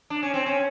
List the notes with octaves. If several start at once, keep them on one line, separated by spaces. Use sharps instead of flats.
D4
C#4
C4
C#4